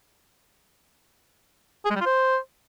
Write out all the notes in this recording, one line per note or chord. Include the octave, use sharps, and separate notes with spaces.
G#4
G#3
G3
F4
C5